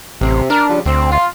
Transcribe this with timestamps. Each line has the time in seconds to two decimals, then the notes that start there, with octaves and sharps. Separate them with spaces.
0.21 A1 C3
0.50 D4 A#4
0.68 C#3 F3 G3
0.86 D2 C4
1.12 F4